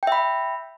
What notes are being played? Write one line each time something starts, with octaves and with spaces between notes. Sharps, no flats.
E5 G5 B5